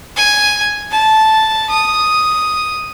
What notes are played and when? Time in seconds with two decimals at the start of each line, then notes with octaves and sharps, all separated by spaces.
0.16 G#5
0.91 A5
1.70 D#6